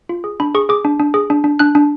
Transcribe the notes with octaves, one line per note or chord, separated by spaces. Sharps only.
F4
G#4
D4 B5
G#4 C#6
G#4 D6
D4
D4
G#4
D4
D4
D4 F#6
D4